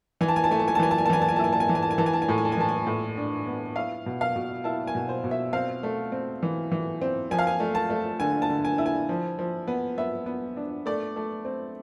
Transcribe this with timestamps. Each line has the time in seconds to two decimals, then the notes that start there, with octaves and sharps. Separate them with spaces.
0.21 E3 G#5
0.28 A5
0.36 G#5
0.44 A5
0.51 A3 G#5
0.60 A5
0.68 G#5
0.75 A5
0.80 E3 G#5
0.91 A5
0.98 G#5
1.06 A5
1.09 E3 G#5
1.22 A5
1.29 G#5
1.36 A5
1.39 E4 G#5
1.53 A5
1.60 G#5
1.68 E3 A5
1.75 G#5
1.83 A5
1.91 G#5
1.98 E3 A5
2.06 G#5
2.13 A5
2.22 G#5
2.28 A2 A5
2.38 G#5
2.45 A5
2.52 G#5
2.57 E3 A5
2.69 G#5
2.87 A2
3.17 D4
3.47 B3
3.76 E4 F5
4.06 B2
4.21 F5
4.36 B2
4.64 E4 A5
4.87 G#5
4.95 B2
5.09 C5
5.24 B2
5.31 E5
5.53 C4 F5
5.83 A3
6.12 C4
6.43 E3
6.72 E3
7.02 C4
7.31 F3 G#5
7.39 F5
7.47 G#5
7.60 A3
7.75 A5
7.90 A3
8.20 D3 G#5
8.42 A5
8.50 D3
8.65 G#5
8.78 E4
8.86 G#5
9.09 F3
9.39 F3
9.68 B3
9.98 B3 E5
10.26 B3
10.57 D4
10.86 A3 D5
11.16 A3
11.45 C4